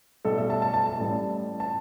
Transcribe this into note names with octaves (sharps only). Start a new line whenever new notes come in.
B1 A2 G3 A4
E5
A5
A5
A5
A5
A1 A2 G3
A5